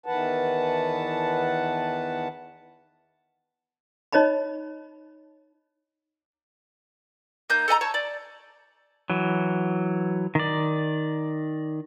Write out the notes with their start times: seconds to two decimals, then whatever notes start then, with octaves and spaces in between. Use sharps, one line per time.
0.06 E2 D#3 E3 B4 F#5 A5
4.13 D#4 C#5 D#5 A#5 B5
7.50 A#3 D#4 G6
7.68 A4 D#5 G#5 A#5
7.81 C#5 A5
7.94 D5
9.10 E3 F#3
10.35 D#3 D5